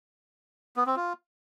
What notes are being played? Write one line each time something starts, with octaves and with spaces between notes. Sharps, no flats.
B3
C4
F4